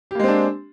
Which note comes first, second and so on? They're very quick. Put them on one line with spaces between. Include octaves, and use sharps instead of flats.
G4 A#3 G#3 C4 D4